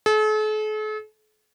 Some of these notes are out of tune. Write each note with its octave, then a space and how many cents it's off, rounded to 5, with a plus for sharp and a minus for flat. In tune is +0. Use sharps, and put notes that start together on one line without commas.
A4 -45